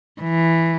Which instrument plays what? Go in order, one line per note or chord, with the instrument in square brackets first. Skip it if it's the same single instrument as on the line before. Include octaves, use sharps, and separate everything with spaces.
[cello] E3